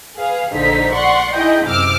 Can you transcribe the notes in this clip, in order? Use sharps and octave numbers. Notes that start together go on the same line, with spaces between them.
G#4 B4 F5
A#1 D3 D#4 C5 B6
D5 F#5 C6 C#6
D#4 E4 G#4 D#5 G5
F#2 C3 D6 E6 F6